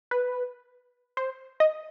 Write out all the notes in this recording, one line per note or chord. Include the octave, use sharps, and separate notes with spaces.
B4
C5
D#5